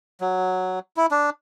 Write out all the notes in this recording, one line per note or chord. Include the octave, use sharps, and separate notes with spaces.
F#3
E4
D4